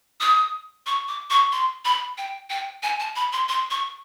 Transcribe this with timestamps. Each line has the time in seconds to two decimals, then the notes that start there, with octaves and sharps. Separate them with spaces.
0.20 D#6
0.86 C#6
1.08 D6
1.30 C#6
1.52 C6
1.85 B5
2.18 G5
2.50 G5
2.83 G#5
3.00 A5
3.16 B5
3.33 C6
3.49 C6
3.70 C#6